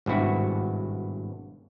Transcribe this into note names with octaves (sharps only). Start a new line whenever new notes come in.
G#1 G2 B2 E4 F#4